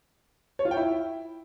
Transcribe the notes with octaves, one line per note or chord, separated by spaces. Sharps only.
C#5
F4
G5
E4